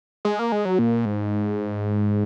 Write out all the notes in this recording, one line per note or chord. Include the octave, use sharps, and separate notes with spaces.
G#3
A#3
G#3
F#3
A#2
G#2